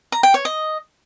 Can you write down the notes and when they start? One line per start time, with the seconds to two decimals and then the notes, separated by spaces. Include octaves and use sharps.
0.12 A#5
0.23 G5
0.34 C#5
0.45 D#5